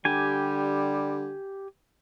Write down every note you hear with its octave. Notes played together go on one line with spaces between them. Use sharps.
D3 G3 G4 G#5